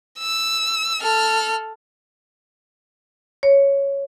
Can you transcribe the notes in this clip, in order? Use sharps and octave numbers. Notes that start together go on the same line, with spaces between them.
E6
A4 F6
C#5